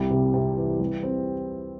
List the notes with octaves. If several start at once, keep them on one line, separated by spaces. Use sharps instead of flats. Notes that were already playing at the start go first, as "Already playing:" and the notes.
Already playing: C2 G3
C3
C3
E3
G3
C4